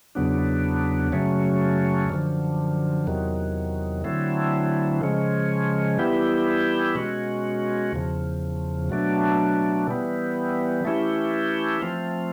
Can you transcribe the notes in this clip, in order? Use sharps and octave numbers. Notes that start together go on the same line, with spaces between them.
E2 C#3 F#3 B3 D4
F#2 C#3 F#3 A3 C#4
F#2 D3 F3
E2 C3 D#3 F#3
D3 F#3 A3 C4 E4
C#3 F3 G#3 C#4
E3 G3 B3 E4 G4
B2 G#3 C#4 F#4
E2 C#3 F3
B2 F#3 A3 D4
E3 G3 B3
E3 A3 C#4 E4 G4
F3 A3 C4 F4